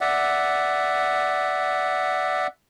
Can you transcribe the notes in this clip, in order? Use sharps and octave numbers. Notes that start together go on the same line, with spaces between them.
D5 E5 F#5